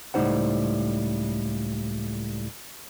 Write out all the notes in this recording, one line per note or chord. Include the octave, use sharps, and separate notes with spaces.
C#2 A2 G3 D#4 C5 F#5